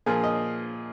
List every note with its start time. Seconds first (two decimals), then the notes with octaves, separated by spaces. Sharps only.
0.06 A#2 F3 A#3 G#4
0.24 D#5